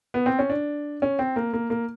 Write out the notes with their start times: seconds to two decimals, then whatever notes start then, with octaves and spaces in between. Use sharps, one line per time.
0.14 B3
0.26 C4
0.39 C#4
0.50 D4
1.02 C#4
1.19 C4
1.36 A#3
1.53 A#3
1.70 A#3